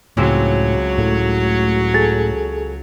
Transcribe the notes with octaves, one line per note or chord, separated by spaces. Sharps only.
C#2 A2 F#3 C4 C#5
A2 A3
G#4 A4 A6